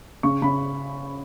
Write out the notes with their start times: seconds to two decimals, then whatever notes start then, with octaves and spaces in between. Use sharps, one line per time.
0.23 C#3 C#6
0.42 C#3 B5